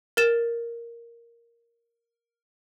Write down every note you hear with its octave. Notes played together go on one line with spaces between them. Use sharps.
A#4 A6 E7